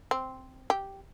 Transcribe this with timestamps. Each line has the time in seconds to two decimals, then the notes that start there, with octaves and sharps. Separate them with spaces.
0.11 C4
0.70 G4